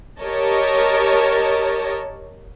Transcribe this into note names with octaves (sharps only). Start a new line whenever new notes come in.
G4 A#4 C#5 D#5 A5